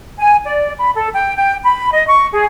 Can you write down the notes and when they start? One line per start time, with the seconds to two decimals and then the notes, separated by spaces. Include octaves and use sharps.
0.18 G#5
0.43 D5
0.78 B5
0.95 A4
1.12 G5
1.35 G5
1.63 B5
1.92 D#5
2.07 C#6
2.32 G#4